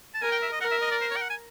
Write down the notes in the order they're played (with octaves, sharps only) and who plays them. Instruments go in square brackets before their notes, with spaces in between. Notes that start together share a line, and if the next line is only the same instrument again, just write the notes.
[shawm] A5
[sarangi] A#4 [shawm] G#5
[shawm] G5
E5
D#5
[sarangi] A#4 [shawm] F#5
[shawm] E5
D#5
D5
C5
C#5
G5
F#5
G#5